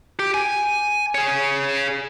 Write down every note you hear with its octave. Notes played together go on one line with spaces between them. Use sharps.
G4
G#5
G#4 C#5